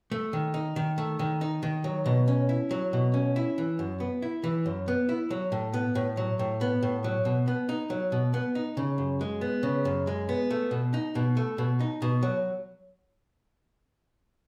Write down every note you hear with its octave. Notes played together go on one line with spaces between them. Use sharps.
A3
D#3
D#4
D#3
A3
D#3
D#4
D#3
F#3
B2
C#4
E4
F#3
B2
C#4
E4
E3
F#2
B3
E4
E3
F#2
B3
E4
F#3
A2
B3
A2
F#3
A2
B3
A2
F#3
B2
B3
D#4
F#3
B2
B3
D#4
C#3
F#2
G#3
B3
C#3
F#2
G#3
B3
A3
B2
D#4
B2
A3
B2
D#4
B2
F#3